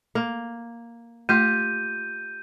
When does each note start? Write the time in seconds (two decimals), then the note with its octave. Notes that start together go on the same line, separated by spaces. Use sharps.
0.15 A#3
1.29 A3 F4 G4 G6 D#7